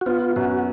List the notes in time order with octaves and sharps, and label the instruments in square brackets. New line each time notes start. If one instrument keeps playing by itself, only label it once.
[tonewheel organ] F#4
[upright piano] B3 [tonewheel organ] F4
[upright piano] F#2 [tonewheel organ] F#4